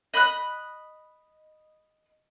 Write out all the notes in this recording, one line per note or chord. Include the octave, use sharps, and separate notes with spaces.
D#5 B5 D#6 F#6